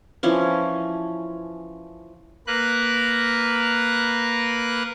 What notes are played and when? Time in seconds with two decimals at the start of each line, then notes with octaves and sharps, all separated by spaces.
0.23 E3 F3 C#4
2.47 A#3 A#4 B4 F#6